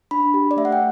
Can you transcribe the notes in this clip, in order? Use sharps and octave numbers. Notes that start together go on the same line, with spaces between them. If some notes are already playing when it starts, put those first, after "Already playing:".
D4 B5
G4
D5
A3 E5
F#5
G5